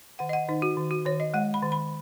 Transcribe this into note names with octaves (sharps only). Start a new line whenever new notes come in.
D#3 F#5
D#5
F#5
D#3 D#4
F#4
D#3
F#4
D#3 C#5
D#5
G#3 F#5
B5
D#3
B5